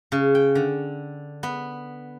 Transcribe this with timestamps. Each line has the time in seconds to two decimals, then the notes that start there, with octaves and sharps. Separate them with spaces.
0.12 C#3
0.35 G5
0.55 D3
1.43 B3